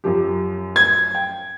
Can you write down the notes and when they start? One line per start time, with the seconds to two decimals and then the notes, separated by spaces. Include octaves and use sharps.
0.04 F#2 F3 G4
0.76 G#6
1.15 G5